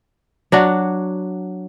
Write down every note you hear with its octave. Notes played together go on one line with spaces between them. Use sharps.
F#3 D4 F#4